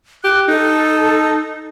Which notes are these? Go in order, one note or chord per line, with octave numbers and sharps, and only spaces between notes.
G4 F#6
D#4 A4